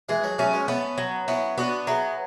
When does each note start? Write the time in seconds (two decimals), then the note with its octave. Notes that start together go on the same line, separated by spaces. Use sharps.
0.09 E3 G#3 G#4
0.23 F#3 A3
0.38 F#3 A3 C#4
0.53 G#3 B3
0.68 A3 B3 C#4
0.98 F#3
1.28 B3 C#4 E4
1.58 B3 D4 F#4
1.87 F#3 E4 G#4